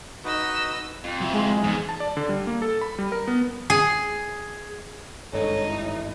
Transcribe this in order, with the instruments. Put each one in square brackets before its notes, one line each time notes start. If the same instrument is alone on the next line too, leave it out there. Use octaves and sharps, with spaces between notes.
[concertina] D#4 F#4 B4 [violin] D#5 E6
[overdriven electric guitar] F2
[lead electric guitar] F#3 E4
[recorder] G#3
[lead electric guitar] E2 [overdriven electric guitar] G#2
[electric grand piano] A5
D5
D3
G3
A#3
A4
B5
G3
A#4
B3
[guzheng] G#4
[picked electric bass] G#1 G2 G#3 [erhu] D#4 [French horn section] A4 C#5
[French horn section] A2 E3 E4